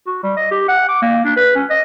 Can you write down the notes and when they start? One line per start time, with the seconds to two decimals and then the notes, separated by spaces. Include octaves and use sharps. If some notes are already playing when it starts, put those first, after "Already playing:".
0.07 F#4
0.23 G3
0.37 D#5
0.51 G4
0.68 F#5
0.89 D6
1.02 A#3
1.25 D4
1.36 B4
1.55 C#4
1.70 D#5